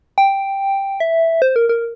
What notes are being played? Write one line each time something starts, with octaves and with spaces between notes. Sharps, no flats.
G5
E5
C5
A#4
A#4